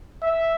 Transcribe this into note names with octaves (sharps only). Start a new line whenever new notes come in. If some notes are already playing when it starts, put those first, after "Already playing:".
E5